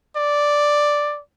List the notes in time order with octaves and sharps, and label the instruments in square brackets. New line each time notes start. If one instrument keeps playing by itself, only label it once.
[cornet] D5